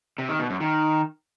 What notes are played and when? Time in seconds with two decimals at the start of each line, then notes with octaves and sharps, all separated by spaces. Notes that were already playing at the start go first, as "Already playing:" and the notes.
0.18 C3
0.29 D#3
0.39 B2
0.50 F#2
0.60 D#3